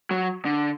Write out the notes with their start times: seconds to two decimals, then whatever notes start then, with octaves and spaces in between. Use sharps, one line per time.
0.11 F#3
0.45 D3